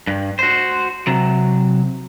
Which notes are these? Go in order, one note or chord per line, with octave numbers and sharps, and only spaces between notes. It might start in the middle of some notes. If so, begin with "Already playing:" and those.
G2
F#4 C5
C3 F#3